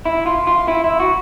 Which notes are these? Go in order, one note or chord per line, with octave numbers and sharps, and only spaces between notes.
E4
F4
F4
E4
E4
F#4